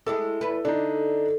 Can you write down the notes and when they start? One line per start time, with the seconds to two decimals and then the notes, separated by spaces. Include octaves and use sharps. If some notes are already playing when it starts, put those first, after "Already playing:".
0.06 G#3 E4 G4 A4
0.41 E2 E4 B4
0.65 D3 D4 D#4